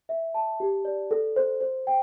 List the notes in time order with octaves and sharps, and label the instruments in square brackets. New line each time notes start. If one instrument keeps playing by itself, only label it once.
[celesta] E5
A5
G4
D5
A4
C5
C5
G5